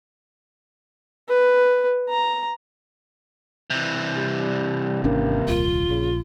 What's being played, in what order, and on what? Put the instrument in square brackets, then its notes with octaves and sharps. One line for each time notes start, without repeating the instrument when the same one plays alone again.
[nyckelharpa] B4
A#5
[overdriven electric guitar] C3 E3
[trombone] G3
[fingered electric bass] G#1 C#4 D4 [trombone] A#3
[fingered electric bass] D#1 C2 [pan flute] F4
[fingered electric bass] A#1 [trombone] C#3